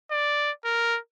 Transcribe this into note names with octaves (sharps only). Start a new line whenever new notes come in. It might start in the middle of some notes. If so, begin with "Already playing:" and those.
D5
A#4